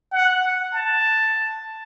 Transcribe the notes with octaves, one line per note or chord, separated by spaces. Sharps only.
F#5
A5